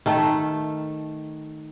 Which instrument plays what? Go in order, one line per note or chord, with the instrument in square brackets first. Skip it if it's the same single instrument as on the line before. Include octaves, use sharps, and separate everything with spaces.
[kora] D#3 A3 A4